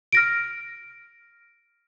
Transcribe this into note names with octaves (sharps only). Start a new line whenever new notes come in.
F6 A#6 D7